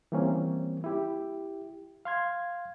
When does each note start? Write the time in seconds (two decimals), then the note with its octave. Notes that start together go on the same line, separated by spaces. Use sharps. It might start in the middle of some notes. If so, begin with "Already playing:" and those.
0.12 E3 G3 A#3 C4 C#4
0.84 E4 G4
2.05 F5 C6 G#6